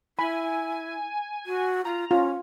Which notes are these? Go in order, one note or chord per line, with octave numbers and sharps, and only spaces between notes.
E4 G#5 B5
F#4
F4 A#5
C#4 F4